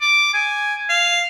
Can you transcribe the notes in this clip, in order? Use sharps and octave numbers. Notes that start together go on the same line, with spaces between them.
D6
G#5
F5